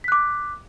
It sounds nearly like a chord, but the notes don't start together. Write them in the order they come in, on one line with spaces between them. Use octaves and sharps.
B6 F#6 D6